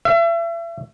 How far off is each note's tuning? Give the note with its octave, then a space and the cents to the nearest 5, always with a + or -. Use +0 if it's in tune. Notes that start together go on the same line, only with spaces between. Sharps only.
E5 +35